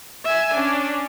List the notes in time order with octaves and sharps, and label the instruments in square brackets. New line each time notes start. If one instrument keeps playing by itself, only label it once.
[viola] E5 G#5
[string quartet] C#4 [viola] D4